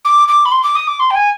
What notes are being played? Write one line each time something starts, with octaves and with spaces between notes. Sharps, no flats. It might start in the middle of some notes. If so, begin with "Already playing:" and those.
D6
D6
B5
C6
D6
D#6
D6
C6
G5
G#5